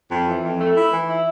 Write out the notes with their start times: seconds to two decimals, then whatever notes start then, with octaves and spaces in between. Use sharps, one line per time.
0.10 F2
0.27 E3
0.43 F2
0.60 A3
0.75 E4
0.92 E3
1.08 E4